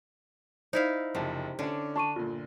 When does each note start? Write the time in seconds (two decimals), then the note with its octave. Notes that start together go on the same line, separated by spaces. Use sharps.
0.73 D#4 E4 C5 D5 F5
1.15 F#1 C3 F3 A5
1.59 D3 C#4 D4
1.96 D4 A5 C#6 D#7
2.16 G1 A#2 F4